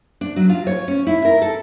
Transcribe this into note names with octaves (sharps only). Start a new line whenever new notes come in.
D4
F#3
F4
C#5
C#4
E4
A#4
A4